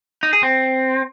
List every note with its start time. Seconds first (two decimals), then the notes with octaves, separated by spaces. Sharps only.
0.23 D#4
0.33 G#4
0.43 C4